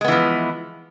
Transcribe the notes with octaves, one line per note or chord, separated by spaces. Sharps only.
E3 F3 G#3 B3